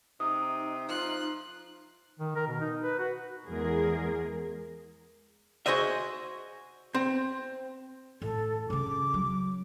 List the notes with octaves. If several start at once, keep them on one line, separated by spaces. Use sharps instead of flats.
C3 D#4 D#6
F3 C6 F#6
D#3
A#4
B2
D#4
B4
F#4
E2 G#3 G#4 A#4
F#4 G#4 C5 D#5 E5
C4
A1 A4
C#3 C#4 D6
F#3